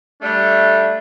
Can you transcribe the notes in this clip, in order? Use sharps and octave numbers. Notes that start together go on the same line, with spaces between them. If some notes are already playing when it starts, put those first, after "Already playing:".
G3 A3 D4